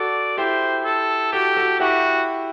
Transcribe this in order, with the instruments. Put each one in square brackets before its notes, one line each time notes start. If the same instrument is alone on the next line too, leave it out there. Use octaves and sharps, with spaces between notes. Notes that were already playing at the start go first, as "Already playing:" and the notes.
Already playing: [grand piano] F#4 A4 [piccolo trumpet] D5
[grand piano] E4 G4 [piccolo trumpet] C5
[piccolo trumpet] A4
[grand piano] F#4 A4 [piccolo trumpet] G4
[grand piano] F#4 A4
[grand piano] E4 G4 [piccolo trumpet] F#4